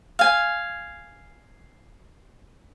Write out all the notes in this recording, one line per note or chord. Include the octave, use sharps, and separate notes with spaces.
F5 G#5